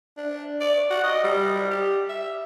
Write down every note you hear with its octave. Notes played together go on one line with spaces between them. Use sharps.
D4
D5
F#4
D#5
G3
G4
E5